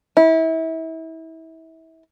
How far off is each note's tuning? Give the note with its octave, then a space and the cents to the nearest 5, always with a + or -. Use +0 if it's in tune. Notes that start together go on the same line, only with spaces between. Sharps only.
E4 -30